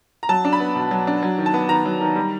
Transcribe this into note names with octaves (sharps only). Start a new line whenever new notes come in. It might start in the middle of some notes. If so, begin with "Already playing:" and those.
A#5
F#3 A5
D4
B5
B3
B2
F#3
D4
F#3
D#3
A5
B3
D#3 A#5
F#3
D#3
G3